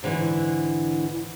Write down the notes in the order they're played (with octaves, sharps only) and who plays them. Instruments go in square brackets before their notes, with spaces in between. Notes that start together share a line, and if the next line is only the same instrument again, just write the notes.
[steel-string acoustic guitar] G#2 D3 E3